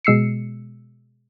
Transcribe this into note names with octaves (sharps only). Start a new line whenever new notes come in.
B2 G#3 E6 C7 C#7